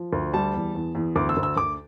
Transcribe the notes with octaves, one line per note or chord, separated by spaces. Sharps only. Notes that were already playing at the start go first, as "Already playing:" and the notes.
Already playing: F3
D2
G3 A5
E2
E2
E2
D2 D6
E6
D2
E6
D2 D6